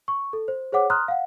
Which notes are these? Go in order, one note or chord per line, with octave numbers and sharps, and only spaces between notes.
C#6
A4
C5
G#4 C5 C#5 F#5 D6
A#5 C6 D#6 F6 F#6
F5 F#5